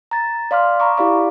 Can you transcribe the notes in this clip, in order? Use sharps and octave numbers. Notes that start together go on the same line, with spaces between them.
A#5 A6
D5 F5 C6 D6 F6
A#5 B5 C#6 D6
E4 G4 D5 F5 D6